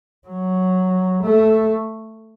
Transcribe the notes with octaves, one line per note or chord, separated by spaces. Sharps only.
F#3
A3